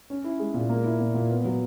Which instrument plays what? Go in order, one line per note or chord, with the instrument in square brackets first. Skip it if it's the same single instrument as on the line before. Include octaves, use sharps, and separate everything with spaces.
[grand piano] C#4
E4
G#3
A#2
A#3
E4
A#2
A#2
B3
F#3